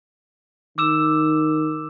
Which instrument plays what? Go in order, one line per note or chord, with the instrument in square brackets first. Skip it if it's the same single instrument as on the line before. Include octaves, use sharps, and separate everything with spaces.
[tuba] D#3 [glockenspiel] D6 E6 E7